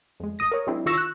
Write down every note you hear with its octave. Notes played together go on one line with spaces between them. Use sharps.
F2 G#3
A1 D#6 A#6
A#4 C#5
F#3 G#3 C4 D4 E4
D#3 F4 C#6 E6 A#6 E7
F#6